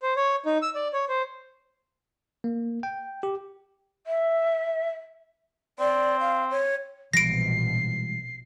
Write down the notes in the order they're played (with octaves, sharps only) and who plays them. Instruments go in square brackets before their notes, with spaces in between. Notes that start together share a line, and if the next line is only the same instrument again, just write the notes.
[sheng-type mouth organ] C5
C#5
D#4
E6
D5
C#5
C5
[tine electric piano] A#3
G5
G4
[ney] E5
[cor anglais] C4 [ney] D5
[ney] F5
C#5
[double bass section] A#1 B2 [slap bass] E3 G3 G#3 [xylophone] A#6 D7 [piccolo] C7